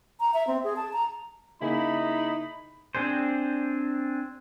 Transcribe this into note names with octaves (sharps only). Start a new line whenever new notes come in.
A#5
E5
C4
G#4
A5
A#5
C#3 A#3 D#4 E4 G#4 B5
C4 D4 G#4 C5